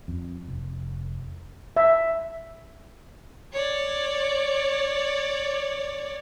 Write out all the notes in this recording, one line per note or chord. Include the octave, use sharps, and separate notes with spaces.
F2
F1
E5
C#5 D5